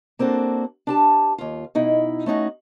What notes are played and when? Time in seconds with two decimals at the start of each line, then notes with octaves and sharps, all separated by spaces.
0.19 A#3 C4 D4 F#4 A4
0.87 D4 G4 A5
1.38 D#2 F4
1.75 B2 D#4 E4
2.26 A3 C#4 D#4 F#4